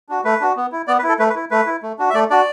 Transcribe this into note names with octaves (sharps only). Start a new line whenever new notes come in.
D4 F#4
A3 B4
D4 F#4
B3
E4
B3 D5
B4
E4
A4
A3 B4
B4
E4
A3 B4
E4
A3
D4 F#4
E5
A3 D5
D4 F#4 D5